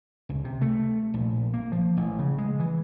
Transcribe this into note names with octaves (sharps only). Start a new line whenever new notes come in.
C#2
C3
A3
A#1
A#3
F3
A1
C#3
G#3
E3